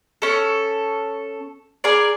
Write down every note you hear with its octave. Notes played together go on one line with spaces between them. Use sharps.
C#4 A4
G#4 A#4 D5